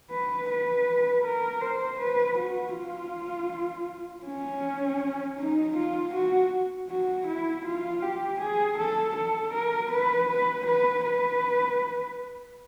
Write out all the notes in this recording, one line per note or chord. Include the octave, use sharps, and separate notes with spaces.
B4
B4
A#4
C5
B4
F#4
F4
C#4
D#4
F4
F#4
F#4
E4
F4
G4
G#4
A4
A4
A#4
B4
B4
B4
B4